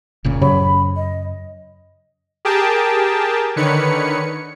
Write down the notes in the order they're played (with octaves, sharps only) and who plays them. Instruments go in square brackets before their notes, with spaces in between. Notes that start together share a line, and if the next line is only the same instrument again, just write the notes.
[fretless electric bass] F1 A#2 C#3
[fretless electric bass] F#2 [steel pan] C#3 C#5 [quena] B5
[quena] D#5
[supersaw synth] G4 G#4 A#4 G5 A5
D3 D#3 B4 C#5 C#7